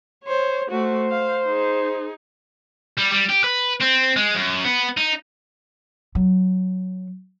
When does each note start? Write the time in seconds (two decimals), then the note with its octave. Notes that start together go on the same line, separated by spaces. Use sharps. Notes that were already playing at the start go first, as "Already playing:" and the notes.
0.23 C5 C#5
0.70 A3 F#4 C5
1.11 F5
1.45 D#4 G#4
2.98 G3
3.13 G3
3.30 G4
3.44 B4
3.80 C4
4.17 G#3
4.35 F#2
4.65 B3
4.97 D#4
6.15 F#3